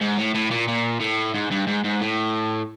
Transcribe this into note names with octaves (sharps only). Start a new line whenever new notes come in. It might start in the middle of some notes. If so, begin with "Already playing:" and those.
G#2
A2
A2
A#2
A#2
A2
G#2
G2
G#2
G#2
A2